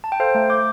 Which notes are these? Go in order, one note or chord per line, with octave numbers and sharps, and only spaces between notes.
A5
G5
A4 C5 F5
A3
A3 D6 G6